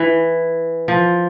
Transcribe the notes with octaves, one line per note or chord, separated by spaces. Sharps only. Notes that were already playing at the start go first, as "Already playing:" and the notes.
Already playing: E3
F3